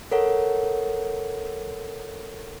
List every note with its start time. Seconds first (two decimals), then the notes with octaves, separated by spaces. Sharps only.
0.11 A4 A#4 C#5 F#5